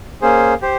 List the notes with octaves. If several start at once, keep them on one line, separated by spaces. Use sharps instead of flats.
A#3 C#4 G#4 C5
G4 C5